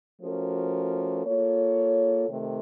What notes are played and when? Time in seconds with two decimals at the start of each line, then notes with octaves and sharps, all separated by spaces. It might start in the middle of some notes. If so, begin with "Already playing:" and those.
0.21 F3 A3 C#4 F#4 A#4
1.25 A#3 F4 A4 C#5
2.28 C3 D#3 A3